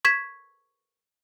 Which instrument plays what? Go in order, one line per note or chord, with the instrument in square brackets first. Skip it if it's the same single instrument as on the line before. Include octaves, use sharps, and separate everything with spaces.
[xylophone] C#6 G#6 B6 E7